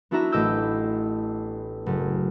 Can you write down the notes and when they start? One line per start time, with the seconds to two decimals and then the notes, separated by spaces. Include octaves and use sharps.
0.11 B3 D4 E4 F#4 E5 A#5
0.32 A1 A3 D#5 D6 E6 G6
1.86 F#1